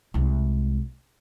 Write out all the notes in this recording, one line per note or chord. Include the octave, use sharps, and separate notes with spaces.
C2 G#3